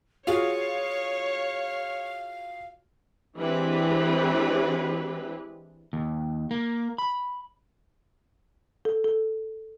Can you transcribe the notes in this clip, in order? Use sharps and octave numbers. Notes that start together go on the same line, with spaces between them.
F4 F#4 G#4 C#5 F5
E3 G#3 C4 D4 G4 B4
D#2
A#3
B5
A4
A4